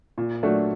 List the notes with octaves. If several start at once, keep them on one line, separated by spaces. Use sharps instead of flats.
A#2
F#3 A3 D4